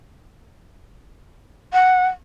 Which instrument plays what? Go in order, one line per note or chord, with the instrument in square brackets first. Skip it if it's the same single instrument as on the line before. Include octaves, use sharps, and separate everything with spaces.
[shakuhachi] F#5